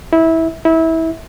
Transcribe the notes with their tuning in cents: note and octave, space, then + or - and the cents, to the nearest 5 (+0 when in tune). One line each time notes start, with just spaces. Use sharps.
E4 -20
E4 -25